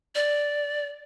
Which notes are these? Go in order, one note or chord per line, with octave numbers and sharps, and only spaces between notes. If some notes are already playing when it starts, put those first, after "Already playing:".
D5